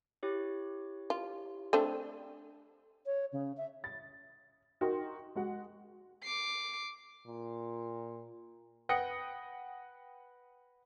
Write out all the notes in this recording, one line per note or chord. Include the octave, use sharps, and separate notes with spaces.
E4 G4 C#5
F4
A3 C4 D4
C#5
C#3
E5
A6
D#4 F#4 A#4 G5 C6
G#3 F#4 F#5
D6 C7
A#2
B4 F#5 G5 D#6 A#6 C#7